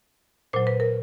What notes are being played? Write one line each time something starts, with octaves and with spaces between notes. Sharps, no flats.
A#2 F#3 C5
B4
A#4